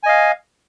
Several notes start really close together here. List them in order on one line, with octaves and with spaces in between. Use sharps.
G#5 D#5 F5